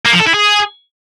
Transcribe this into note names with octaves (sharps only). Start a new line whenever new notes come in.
A#3
F3
A4
E4
G#4